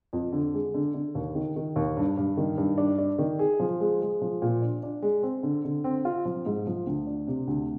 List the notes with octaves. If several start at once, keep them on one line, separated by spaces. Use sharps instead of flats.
F2
D3
G#3
D3
D3
D#2
D#3
D#3
D#2
G2
G2
D#3
G2
D4
D4
D#3
G#4
F3
G#3
G#3
F3
A#2
D4
D4
G#3
C4
D3
D3
C4
F4
F3
G#2
F3
D2
D4
C3
D2